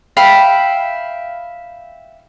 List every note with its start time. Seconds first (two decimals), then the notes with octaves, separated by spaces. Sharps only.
0.17 E5 F5 G5 B5